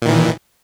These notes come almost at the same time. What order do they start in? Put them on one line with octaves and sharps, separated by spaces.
A#2 D#3 E3